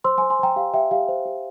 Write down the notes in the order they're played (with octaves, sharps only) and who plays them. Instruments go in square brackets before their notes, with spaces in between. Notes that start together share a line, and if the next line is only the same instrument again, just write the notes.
[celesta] C5 C6 E6
G#5 C6
C5
G#5 C6
C5 G5 A#5
G4 F5
G4 E5 G5
G4 F5
C5
G4